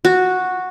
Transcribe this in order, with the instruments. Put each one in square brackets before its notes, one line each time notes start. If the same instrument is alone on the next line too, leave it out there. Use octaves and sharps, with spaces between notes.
[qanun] F#4